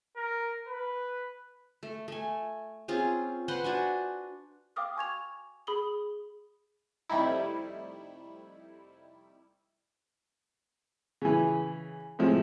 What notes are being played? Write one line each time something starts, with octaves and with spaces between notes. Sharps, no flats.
A#4
B4
A3
A3 G#5
C4 C#4 F4 G#4
B4 C5 F#5 C6
D4 F#4 G#5
F5 G5 D6 D#6 F6
G#5 C#6 G#6 F7
G#4 B5 D#6 F#7 G7
F2 C3 G3 A3 D#4 E4
C#3 E3
A2 C3 F3 G#3